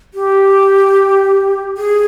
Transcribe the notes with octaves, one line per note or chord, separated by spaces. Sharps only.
G4
G#4